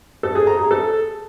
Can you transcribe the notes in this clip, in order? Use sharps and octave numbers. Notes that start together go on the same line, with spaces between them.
A4
G#4
A#5
G#4
A4